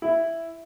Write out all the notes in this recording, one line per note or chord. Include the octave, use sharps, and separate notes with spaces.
E4